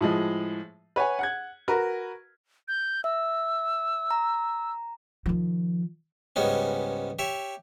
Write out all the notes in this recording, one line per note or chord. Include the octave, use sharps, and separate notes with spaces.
A2 F3 G#3
B4 C#5 F#5 G#5
F#5 F#6 G#6
F#4 A#4 B4
G6
E5 E6
A#5
D#3 F3
C#2 G#2 G3 G#3 B3 C#4
G4 C#5 E5